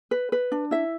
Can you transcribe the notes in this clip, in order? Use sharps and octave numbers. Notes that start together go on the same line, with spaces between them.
B4
B4
D4
E4 E5